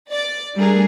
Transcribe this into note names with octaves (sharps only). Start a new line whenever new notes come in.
D5
G3 A3 D4 G#4 A#4